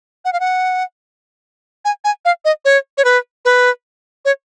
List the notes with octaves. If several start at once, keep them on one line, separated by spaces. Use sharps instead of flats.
F#5
F5
F#5
G#5
G#5
F5
D#5
C#5
C#5
B4
B4
C#5